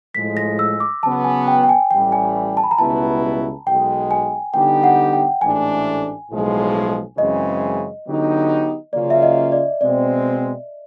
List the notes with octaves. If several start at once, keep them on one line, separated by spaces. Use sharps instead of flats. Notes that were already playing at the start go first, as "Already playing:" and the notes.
A2 F3 G#3 B6
A#6
E6
D6
C#3 F#3 B3 A5
G#5
G5
G5
G#5
A1 A2 E3 G3 G5
G#5
A5
B5
A#5
C#2 B2 G3 B3 E4 A5
B1 B2 G#3 G5
G#5
D3 G3 B3 D#4 G4 G5
F#5
G5
A1 G#2 E3 A3 D4 G#5
B1 A2 F3 G#3
F#2 C#3 E3 G#3 C4 D#5
D3 F#3 B3 D#4 G4
C#3 F#3 A#3 C#4 F4 D5
E5
D#5
D5
B2 G#3 C4 D5